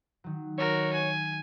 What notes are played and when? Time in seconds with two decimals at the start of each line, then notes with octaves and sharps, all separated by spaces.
0.24 D#3 F#3
0.58 F#4 A#4 C#5
0.93 G#5